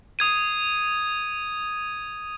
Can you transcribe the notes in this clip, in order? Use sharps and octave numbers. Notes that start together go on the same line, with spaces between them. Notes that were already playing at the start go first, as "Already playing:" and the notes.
D#6 G#6 D#7